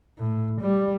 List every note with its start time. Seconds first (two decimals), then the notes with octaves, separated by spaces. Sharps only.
0.19 A2
0.61 G3